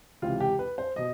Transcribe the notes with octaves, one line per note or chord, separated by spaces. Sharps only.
C#2 C3 E3 F4
G4
B4
C5
B2 D#5